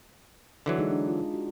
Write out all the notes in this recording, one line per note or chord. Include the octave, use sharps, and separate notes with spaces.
D3 E3 F#3
G#3 D#4 G#4
D4
F4
F#4